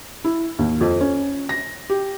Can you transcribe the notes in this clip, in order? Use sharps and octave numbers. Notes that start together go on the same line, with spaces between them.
E4
D#2
F2
C#4
A#6
G4